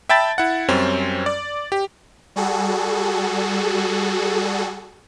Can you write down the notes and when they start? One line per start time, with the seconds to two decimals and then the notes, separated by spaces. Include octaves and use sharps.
0.09 E5 G5 A5 B5 A6
0.38 E4 F#5
0.68 F#2 G3 C4 C#4
1.26 D5
1.72 G4
2.36 G3 F#4 G#4 A4